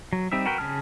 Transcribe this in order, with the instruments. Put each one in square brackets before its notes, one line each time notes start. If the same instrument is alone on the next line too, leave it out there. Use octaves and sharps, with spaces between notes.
[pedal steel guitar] F#3
G3 C4 D#4 E5
F#4 A#4 B4 G5
C#3 G#4 A5 F6